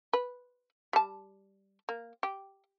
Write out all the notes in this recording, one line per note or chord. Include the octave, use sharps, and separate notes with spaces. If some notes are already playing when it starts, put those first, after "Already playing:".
B4
G3 A5
A#3
G4